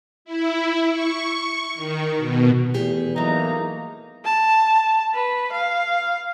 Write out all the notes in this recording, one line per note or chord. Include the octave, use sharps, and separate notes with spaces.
E4
C#6
D#3
B2
E2 A3 G4 G#4
A2 E3 F#3 G#3 A#3 D#4 A#5
A5
B4
F5